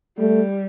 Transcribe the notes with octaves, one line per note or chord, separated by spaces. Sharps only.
G3 A3